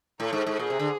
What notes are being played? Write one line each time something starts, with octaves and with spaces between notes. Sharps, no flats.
A2 A4
G#2
G#2
A#2 G#4
C3
D3